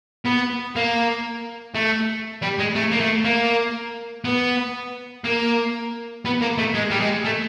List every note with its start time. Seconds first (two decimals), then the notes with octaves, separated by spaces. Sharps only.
0.25 B3
0.76 A#3
1.75 A3
2.42 G3
2.59 G#3
2.75 A3
2.91 A#3
3.00 A3
3.25 A#3
4.25 B3
5.24 A#3
6.25 B3
6.41 A#3
6.58 A3
6.74 G#3
6.90 G3
7.00 G#3
7.25 A3